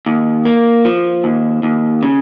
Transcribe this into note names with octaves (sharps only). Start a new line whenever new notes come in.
D#2
A#3
F3
D#2
D#2
C#3